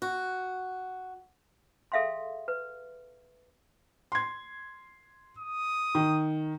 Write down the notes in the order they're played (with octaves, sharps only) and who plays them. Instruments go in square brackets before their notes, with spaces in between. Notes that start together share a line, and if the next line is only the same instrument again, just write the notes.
[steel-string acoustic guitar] F#4
[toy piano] G#4 A4 E5 F5 G5 C6
B4
[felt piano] C6 G#6
[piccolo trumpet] D#6
[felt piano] D#3